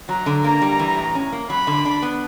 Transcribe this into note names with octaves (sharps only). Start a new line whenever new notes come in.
F#3 A#5
D3
A#3 A#5
G3
E3
A2
C#4
A#3
F#3 B5
D3
D4
B3